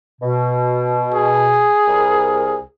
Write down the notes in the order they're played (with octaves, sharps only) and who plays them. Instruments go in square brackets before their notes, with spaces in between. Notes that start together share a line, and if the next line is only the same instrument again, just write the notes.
[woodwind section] B2
[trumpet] G#4
[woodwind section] C2 A#4